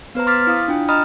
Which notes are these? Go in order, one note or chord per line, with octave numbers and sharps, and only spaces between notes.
B3 B4 C5 A#5
C6 D6 F6 A6 B6
E4 F5 D#6
D4 F4 G5
D#5 A#5 B5 D#6 F6